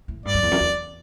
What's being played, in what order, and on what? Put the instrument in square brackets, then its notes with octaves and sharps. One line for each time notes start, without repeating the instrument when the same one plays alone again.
[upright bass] A2
[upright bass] G2 [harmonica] D5
[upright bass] F#2
E2
F#2
E2